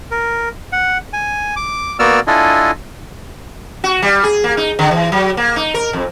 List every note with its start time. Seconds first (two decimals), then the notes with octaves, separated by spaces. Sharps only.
0.11 A#4
0.72 F#5
1.13 G#5
1.56 D6
1.99 A#3 B3 F#4 D5 E6 F6
2.27 D4 E4 F4 A4 D#5 G#5
3.84 F#4
4.02 G3
4.24 G#4
4.44 A#3
4.57 D#4
4.79 D3
4.91 E3
5.12 F#3
5.37 A#3
5.56 D#4
5.74 A#4
5.93 F2